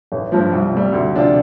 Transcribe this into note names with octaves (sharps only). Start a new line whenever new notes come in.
A1
G2 F3
C2
C3 G3
D2
C3 F3 D4 F4